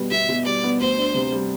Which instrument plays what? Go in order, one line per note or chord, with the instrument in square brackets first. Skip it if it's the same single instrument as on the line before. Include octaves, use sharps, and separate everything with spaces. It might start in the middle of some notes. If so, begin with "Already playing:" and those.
Already playing: [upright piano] B2 G3 B3
[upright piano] B2 [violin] E5
[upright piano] B2
[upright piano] G3 [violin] D5
[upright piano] B3
[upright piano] D2 [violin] C5
[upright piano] D4
C3
G3